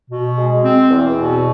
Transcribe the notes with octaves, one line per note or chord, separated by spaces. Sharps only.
B2
G#3
C4
E2
B2